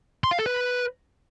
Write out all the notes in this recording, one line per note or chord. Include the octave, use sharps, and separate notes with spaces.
C6
F5
A4
B4